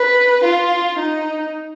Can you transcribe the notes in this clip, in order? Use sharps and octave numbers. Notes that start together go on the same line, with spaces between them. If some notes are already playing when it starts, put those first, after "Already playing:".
Already playing: B4
F4
D#4